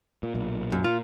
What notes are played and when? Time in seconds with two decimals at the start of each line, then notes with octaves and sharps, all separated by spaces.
0.23 A#2
0.34 B1 A#2
0.72 F#2
0.84 A#2 F4